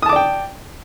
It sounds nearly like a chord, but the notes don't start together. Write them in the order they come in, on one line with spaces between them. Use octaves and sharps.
D#6 A5 D6 D5 G5